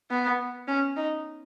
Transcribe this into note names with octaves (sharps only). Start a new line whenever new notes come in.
B3
C#4
D#4